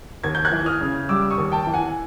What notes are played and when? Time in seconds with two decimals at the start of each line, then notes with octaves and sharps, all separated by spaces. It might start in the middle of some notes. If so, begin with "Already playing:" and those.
0.23 D#2 G#6
0.35 G6
0.45 F#6 G#6
0.52 E3
0.66 D#6 F6
0.81 C#3
1.09 G3 D6 E6
1.31 C#6 D#6
1.38 D#2
1.52 G5 A5
1.67 E3
1.73 F#5 G#5